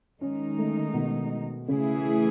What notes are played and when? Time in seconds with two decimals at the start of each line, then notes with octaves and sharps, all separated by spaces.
0.21 D#3 G#3 C#4 D#4
0.58 A3
0.94 B2
1.68 C#3 E3 A3 E4 G#4